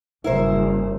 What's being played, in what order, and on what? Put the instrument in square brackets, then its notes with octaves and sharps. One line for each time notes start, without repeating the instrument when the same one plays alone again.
[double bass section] F#1 G2 [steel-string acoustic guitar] E4 A#4 C5